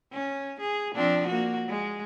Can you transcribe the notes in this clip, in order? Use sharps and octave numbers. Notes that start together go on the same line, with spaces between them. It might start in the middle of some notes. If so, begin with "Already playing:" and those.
C#4
G#4
F3 C4 D4
A#3 F#4
G#3